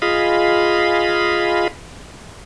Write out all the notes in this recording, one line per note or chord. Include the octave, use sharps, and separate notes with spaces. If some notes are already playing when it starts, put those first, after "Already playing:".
F4 G#4 D#5 F5 B5